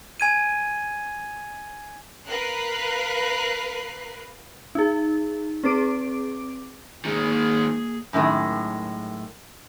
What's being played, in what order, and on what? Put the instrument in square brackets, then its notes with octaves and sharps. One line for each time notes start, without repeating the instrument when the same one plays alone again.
[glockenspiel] G#5 G#6 D#7
[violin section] A#4 B4 F5 F#6 C7
[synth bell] D#4 G#4
C4 G#4 B4 D6 D7
[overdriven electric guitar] D#3 G#3 [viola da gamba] A#3 G#4
[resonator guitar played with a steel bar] F#2 A2 D#3 G#3